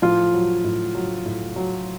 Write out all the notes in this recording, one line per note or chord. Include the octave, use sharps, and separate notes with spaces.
A2 F3 F4
F#3
A2
F#3
A2
F#3